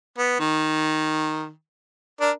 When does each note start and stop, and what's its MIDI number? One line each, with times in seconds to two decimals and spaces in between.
0.18 0.36 59
0.40 1.50 51
2.20 2.31 62
2.20 2.31 70
2.20 2.31 74